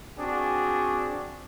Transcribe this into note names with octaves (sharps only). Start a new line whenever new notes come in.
C4 D4 F#4 G#4